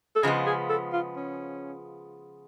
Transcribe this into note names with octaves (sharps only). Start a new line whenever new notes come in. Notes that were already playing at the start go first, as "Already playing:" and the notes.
A4
C#3 F3 G#3 B3 G#4
G#4
A4
F4
C#4